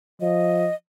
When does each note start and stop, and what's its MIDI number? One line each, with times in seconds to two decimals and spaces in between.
0.21 0.68 53
0.21 0.74 75